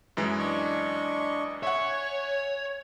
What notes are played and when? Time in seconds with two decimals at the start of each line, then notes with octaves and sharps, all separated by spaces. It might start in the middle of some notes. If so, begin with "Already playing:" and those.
0.17 F#2 E3 G#3
0.38 D4 D#5 C#6
1.63 C#5 E5 F#5 G#5